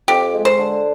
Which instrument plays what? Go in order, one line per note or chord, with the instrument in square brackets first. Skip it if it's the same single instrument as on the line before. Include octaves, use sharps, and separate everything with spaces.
[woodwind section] F2 [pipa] G4
[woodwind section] G#3
[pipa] C5
[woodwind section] D3